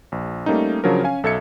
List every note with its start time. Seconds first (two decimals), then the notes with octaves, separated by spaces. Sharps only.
0.12 A#1
0.46 G3 A3 A#3 C#4 D#4
0.84 C#3 F3 F#3 D4 A#4
1.03 C#4 F5 G#5
1.23 B1 A4 E5 G#6 C#7